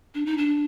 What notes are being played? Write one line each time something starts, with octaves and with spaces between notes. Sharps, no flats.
D4
D#4
D4